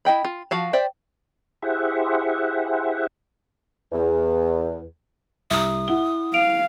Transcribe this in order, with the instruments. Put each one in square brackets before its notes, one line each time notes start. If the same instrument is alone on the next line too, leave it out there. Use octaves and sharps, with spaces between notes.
[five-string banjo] E4 D#5 G5 B5
F4
F3 F#4 F5 A5
C5 D5 E5 G5
[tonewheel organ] E4 G4 G#4 C5 E5 F#5
[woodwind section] E2
[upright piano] C2 A#5 [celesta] E5 [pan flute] D#6
[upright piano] E4 F#5 G7
[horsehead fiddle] F5 [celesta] D7 F7